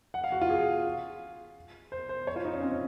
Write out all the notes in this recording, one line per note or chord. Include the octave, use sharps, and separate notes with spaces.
F#5
F5
F#4
F4
G#4
C5
C5
C#5
F4
D#4
C#4
C4
C#4